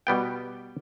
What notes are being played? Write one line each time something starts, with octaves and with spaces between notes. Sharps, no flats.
B2 G3 B3 G5